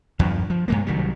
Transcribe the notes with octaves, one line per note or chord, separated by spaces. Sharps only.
E2 G2 F3
F3
G2 G#3 A#3
C2 D#3 F#3 G3